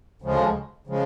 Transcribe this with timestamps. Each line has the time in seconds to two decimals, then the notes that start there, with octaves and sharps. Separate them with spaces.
0.22 D2 C#3 F3 G#3
0.87 C#3 F3 G#3